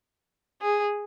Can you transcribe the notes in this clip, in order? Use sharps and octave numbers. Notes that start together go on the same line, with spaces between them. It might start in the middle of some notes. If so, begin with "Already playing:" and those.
G#4